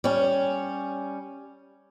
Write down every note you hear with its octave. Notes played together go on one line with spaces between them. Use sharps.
G3 C#4